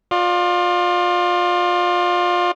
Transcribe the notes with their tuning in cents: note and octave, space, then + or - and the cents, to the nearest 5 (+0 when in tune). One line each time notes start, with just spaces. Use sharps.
F4 +25 D5 +30